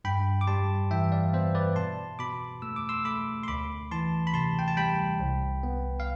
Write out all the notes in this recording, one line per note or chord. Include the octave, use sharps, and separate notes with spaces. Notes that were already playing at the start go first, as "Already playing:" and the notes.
G2 G5 B5
D6
G3 A5 C6
E3 E5 G5
D5 F5
B3 C5 E5
B4 D5
B2 A5 C6
B2 B5 D6
A3 E6
D6
C6 E6
A3 B5 D6
C6
D2 B5 D6
E3 A5 C6
B5
C3 A5 C6
G5
A5
G3 G5 B5
C2
B3
F5